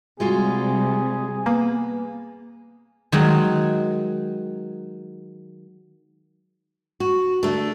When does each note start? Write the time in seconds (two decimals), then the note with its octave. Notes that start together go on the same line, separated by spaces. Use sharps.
0.20 C3 G3 G#3 F4 F#4 G#4
1.46 A#3 B3
3.12 D#3 F#3 G#3
7.00 F#4
7.43 D3 A3